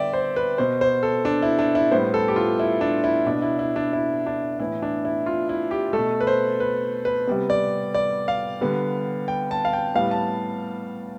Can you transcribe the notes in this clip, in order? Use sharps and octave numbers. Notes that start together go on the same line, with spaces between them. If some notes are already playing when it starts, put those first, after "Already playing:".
Already playing: D3 G3 B3 D5 E5 G5
C5
B4
B2 B3 C5
C5
A4
D4
E4
D4
E4
A2 G3 B3 C5
A4
G4
F4
E4
D4
E4
B2 B3 D4
E4
E4
D4
E4
D4
A2 E3 B3 E4
D4
E4
F4
E4
G4
A3 A4
B2
B4
C5
B4
B4
C3 G3 B3
D5
D5
F5
D3 G3 B3
G5
A5
F5
G5
A2 G3 B3 F5
A5